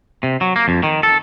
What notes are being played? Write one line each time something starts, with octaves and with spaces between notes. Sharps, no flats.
C3
F#3
A#3
F2
D#3
A4